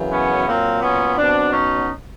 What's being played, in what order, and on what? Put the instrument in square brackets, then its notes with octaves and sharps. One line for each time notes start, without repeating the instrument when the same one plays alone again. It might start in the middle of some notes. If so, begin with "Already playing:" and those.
Already playing: [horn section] F#2 C#3 E3
B3 C#4
A#2 F#3 A#3 C4
B3 C#4
B2 F#3 C4 D4
C#4 D#4